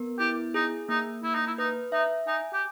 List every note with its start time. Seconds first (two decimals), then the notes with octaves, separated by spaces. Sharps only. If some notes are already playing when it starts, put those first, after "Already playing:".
Already playing: B3 A#4
0.19 E4 G4
0.54 D#4 G#4
0.89 A#3 D#4
1.23 A#3 E4
1.35 D#4
1.47 E4
1.58 D#4 B4
1.92 D#4 E5
2.27 D#4 G#5
2.53 G4